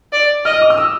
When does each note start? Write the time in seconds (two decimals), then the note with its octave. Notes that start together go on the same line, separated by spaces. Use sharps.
0.12 D5
0.45 D#5 F6
0.62 D6
0.70 D#6
0.78 E6